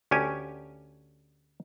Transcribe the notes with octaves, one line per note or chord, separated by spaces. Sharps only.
D2 C#4 G4 G#5